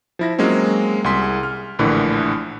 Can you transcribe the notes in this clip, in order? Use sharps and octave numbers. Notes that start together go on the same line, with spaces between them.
F3 E4 A#6
F#3 G#3 A#3 C4 C#4
C2 G#4 C6 B6
F6
A#1 A2 D3 E3 A#4